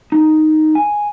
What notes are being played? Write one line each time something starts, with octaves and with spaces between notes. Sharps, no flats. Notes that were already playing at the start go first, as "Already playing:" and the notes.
D#4
G#5